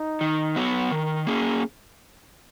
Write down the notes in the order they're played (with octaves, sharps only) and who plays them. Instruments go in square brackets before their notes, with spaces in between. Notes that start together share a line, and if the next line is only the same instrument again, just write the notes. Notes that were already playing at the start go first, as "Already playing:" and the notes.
Already playing: [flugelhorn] D#4
[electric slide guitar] D#3
F#3 B3 F#4
[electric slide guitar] D#3 [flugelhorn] A#4
[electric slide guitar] A#3 C#4 G#4